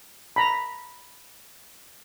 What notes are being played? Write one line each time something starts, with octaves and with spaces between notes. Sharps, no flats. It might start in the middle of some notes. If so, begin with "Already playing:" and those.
A#5 B5